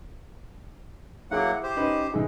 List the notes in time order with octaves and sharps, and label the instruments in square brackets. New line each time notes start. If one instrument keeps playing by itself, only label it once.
[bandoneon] F#3 A#3 F#5 [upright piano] E4 G#4 D6
[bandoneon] G4 C5
[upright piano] C#4 D#4 B4
E3 G#3 D#4